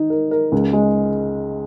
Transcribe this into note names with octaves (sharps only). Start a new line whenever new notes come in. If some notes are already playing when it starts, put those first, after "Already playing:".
Already playing: D#3 D#4
A#4
A#4
C#2
G#3